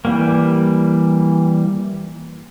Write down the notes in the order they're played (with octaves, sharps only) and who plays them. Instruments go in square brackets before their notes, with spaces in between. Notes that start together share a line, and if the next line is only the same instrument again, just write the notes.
[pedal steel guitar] E3 G3 A#3